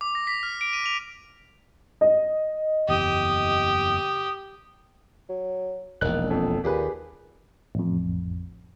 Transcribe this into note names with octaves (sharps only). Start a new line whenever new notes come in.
D6
A#6
B6
F6
D7
D#7
F7
D#5
F#1 E2 G4 D#6
F#3
E1 A#1 D#3 F#6
F2 A4
D#2 A#2 G4 G#4 B4
A1 F2